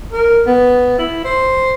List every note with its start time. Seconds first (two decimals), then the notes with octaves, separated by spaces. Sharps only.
0.13 A#4
0.46 B3
0.98 E4
1.25 C5